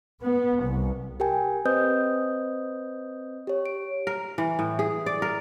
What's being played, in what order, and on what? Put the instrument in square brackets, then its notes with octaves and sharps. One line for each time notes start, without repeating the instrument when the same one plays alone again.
[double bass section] B3
C2
[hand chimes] G4 A#4 G5 G#5
C4 B4 C5 D#5 D#6 G6
G4 C#5
D7
[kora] A#4
E3
A2
G#4
D5
A#4